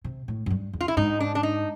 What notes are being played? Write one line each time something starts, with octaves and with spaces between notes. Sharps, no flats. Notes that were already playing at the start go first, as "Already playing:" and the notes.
C3
A2
F#2
G2
E2
F4
E4
G#2 D#4
D4
D4
D#4